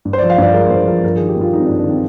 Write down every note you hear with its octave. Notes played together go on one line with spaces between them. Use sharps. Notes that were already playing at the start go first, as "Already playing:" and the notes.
G2
C5
D5
F3
F5
G2 D5
G#3 A#4
G2 C5
F3 A#4
G2 A#4
G#4
D#3
G4
G2 F4
G#3 D#4
C4
D4
G2
D4
D#3 C4